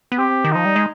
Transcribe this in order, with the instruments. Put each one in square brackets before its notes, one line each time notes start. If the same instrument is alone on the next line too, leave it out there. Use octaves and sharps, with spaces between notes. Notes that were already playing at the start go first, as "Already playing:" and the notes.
[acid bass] B3
[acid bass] C4 [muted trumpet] G4
[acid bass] D#3
[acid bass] F3 [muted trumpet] D#4
[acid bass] G3
G#3